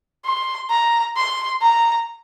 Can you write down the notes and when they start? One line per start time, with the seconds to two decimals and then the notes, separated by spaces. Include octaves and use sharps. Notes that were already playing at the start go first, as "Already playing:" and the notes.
0.25 C6
0.70 A#5
1.16 C6
1.62 A#5